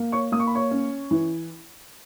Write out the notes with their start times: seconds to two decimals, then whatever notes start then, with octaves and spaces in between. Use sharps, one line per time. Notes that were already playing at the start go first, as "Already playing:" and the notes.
Already playing: A#3
0.12 C#5 C#6
0.32 A#3 D#6
0.40 C#6
0.47 B5
0.55 C#5 C#6
0.71 C#4
1.11 E3